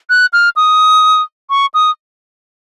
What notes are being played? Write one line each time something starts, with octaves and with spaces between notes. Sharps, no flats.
F#6
F6
D#6
C#6
D#6